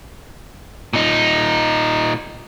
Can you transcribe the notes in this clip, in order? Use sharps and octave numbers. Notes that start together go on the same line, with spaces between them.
A#2 D#4